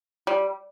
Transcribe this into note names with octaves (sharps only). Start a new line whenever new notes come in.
G3